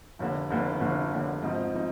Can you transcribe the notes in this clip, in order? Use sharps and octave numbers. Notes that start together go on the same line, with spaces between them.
F1 D#2 D3
F1 D#2 D3
F1 D#2 D3
F1 D#2 D3
G#1 G#2 F3 C4 D#4
F3 C4 D#4